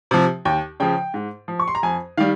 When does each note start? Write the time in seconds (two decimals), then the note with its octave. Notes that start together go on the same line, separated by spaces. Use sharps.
0.11 C3 F3
0.45 D#2 G5
0.80 C#3 F3 G5
1.14 G#2
1.48 F3
1.60 C#6
1.68 C6
1.75 A#5
1.83 F2 G#5
2.17 D#3 G3 F5